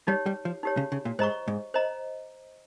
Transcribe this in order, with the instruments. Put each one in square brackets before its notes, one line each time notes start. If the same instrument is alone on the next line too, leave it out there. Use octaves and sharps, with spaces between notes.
[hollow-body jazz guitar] G3 [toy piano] D#4 G4 C#5
[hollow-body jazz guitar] G3
F3
[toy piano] D#4 G4 C#5
[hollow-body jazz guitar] C#3
C#3
A#2
[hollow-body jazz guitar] G#2 [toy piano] C5 D#5 A#5 C#6
[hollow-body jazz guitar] G#2
[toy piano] C5 D#5 A#5